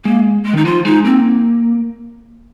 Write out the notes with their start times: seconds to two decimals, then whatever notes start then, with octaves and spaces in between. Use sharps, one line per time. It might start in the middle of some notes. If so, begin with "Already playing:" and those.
0.05 G#3 A#3
0.46 G#3
0.53 D#3 D#4
0.65 F3 F4
0.85 G#3 D#4
1.05 A#3 C4